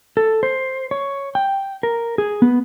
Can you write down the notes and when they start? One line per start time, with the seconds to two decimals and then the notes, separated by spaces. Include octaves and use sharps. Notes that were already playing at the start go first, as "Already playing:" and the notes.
0.17 A4
0.43 C5
0.91 C#5
1.35 G5
1.83 A#4
2.18 G#4
2.42 B3